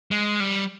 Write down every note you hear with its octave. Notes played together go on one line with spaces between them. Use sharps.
G#3
G3